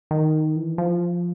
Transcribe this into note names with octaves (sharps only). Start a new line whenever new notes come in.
D#3
E3
F3